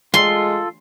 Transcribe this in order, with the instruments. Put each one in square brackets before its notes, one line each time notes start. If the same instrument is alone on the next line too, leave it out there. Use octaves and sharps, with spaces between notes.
[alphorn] G#3 [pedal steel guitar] F4 A4 [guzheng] C6